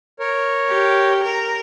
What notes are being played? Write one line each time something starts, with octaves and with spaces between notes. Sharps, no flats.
A#4 C#5
G4
A#4